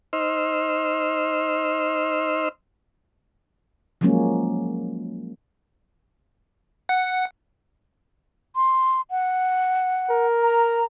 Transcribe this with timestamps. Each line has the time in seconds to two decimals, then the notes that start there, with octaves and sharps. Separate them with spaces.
0.13 D#4 C5 D#5 C6 E6 F6
4.01 F3 F#3 G#3 A#3 C#4
6.89 F#5
8.56 C6
9.11 F#5
10.10 A#4
10.42 A#5